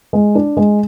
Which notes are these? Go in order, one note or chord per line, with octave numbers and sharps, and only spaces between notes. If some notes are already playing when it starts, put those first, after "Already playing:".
G#3
D4
G#3